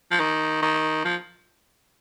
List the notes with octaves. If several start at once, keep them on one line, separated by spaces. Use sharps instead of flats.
F3
D#3
D#3
F3